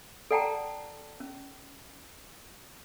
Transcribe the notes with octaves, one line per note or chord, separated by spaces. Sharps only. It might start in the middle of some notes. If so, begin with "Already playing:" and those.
A4 D5 F#5 G5 A5 A#5
C#4